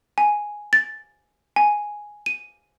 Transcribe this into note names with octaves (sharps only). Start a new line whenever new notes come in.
G#5
A6
G#5
D#7